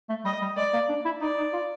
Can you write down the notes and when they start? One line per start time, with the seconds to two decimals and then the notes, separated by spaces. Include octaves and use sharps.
0.10 A3
0.25 G3 D#5
0.41 G3
0.57 G#3 D5
0.73 A#3
0.89 D4
1.05 E4
1.21 D#4 D5
1.37 D#4
1.53 F4